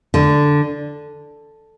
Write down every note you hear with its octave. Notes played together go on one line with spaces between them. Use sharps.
D3